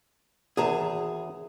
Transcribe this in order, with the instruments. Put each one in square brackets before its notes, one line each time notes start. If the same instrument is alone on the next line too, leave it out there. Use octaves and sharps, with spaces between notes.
[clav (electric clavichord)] G#1 E2 [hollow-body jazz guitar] G#4 A5 A#5